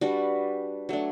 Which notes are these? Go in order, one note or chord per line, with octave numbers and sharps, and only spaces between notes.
G3 D4 F#4 B4
F#3 A3 D4